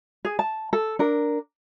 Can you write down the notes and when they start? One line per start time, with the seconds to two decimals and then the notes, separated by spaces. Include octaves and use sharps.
0.25 G#4
0.39 A5
0.73 A4
0.99 D4 A#4